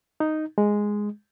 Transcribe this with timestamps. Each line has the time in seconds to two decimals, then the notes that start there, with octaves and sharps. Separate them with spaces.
0.20 D#4
0.58 G#3